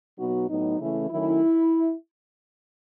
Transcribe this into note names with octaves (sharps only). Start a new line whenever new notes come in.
B2 F#3 B3 D#4 F#4
A2 F#3 B3 D#4
C#3 E3 A3 C#4 E4
D#3 F#3 A3 C#4 E4